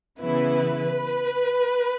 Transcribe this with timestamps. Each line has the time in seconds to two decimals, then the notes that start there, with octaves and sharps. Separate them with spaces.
0.20 C#3 E3 B3 E4 B4